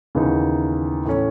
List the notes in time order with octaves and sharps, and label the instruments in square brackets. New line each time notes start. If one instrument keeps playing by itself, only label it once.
[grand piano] D#2 C#3 E3 B3 D#4
A2 E3 A3 C#4